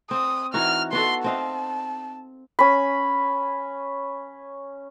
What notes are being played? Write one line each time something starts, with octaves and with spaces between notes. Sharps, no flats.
C4 D#6
E3 D#4 F#4 F6
B3 F#4 A4 C6
C4 D#5 F5 A5
C#4 B5